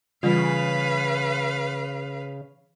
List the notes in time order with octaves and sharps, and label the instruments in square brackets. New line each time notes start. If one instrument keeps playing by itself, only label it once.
[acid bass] C#3 [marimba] E3 G3 F4 [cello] B4 F5